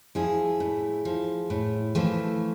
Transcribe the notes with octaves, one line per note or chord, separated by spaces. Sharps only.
F3 E4 G#4
A2
F3
A2
E3 F3 A3